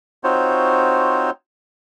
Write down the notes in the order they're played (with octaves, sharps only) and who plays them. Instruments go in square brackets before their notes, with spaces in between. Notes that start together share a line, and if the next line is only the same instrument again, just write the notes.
[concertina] C4 D#4 F4 F#4 C5 C#5